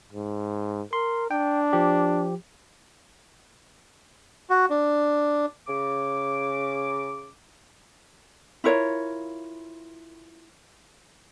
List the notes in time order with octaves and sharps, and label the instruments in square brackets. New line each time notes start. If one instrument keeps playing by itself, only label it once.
[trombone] G#2
[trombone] A#4 [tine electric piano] C6
[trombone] D4 [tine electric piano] G5
[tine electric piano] F3 G4
[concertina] F#4
D4
[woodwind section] C#3 D6
[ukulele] E4 F4 A#4 C#5